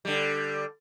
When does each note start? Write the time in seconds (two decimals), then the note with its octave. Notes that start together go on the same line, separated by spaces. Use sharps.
0.05 D3 G3